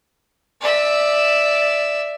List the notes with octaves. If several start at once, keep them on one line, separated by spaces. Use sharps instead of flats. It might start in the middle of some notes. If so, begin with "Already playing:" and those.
D5 E5